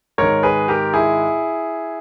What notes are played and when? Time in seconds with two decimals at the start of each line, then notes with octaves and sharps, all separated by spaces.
0.18 G#2 D#3 A#4 C#5
0.43 G#4 B4
0.68 G4 A#4
0.93 E4 G#4